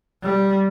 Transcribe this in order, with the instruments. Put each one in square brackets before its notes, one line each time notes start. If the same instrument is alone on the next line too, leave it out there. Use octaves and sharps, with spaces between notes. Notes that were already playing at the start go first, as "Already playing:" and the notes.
[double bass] G3